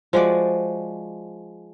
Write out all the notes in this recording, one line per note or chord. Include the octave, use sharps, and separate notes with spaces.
F3 G#3 F#4 D5